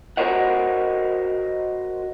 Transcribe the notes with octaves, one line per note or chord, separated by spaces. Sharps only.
F#4 A#4 C5 C#5 D#5 F#5